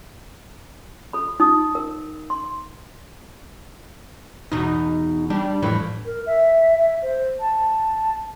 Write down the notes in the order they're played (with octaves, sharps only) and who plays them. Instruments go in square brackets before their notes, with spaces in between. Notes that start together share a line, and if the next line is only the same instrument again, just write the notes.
[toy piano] A4 B5
D#4 D#6
A#4
C6
[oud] E2 B2 [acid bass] D#4
[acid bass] G3 [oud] D4
[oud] F2 A2 E3
[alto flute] A#4
E5
E5
C5
A5